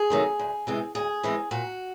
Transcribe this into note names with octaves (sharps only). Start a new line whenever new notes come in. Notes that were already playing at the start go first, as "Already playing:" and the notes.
Already playing: G#4
C3 D#3 F#3 A3
D2
C3 E3 G#3 C4
D2 G#4
C3 E3 G#3 C4
A#2 F#4